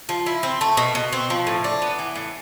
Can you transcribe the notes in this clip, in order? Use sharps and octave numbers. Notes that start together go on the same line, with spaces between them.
F3
E4
C4
A3
B2
B2
C4
F3
A2
D4
B3
E3
A2